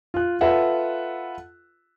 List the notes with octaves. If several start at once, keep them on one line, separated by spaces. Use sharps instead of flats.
F4 F#6
F4 A4 B4 E5 F#5